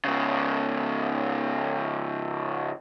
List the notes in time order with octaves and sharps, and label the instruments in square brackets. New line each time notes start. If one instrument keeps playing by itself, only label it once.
[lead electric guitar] G#2 C#3